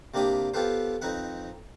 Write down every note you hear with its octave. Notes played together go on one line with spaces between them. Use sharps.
C3 A#3 D4 G4 B5 D#6
B3 F4 G4 A4 B4 C5
F2 C4 D#4 B4 F#5